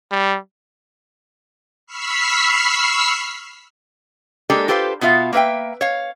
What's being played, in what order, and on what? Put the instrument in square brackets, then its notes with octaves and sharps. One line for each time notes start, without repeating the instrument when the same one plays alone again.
[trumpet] G3
[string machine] B5 C#6 E6 F6 B6 C7
[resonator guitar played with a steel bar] G#3 A#3 D4 G4 A4
F4 G4 A4 B4 C5 F5
B2 B3 F4 E5 F5
A#3 B3 B4 E5 G5
C#5 F5